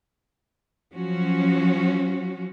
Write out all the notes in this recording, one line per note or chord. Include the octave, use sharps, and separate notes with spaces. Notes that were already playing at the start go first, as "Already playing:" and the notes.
F3 F#3 C#4 F#4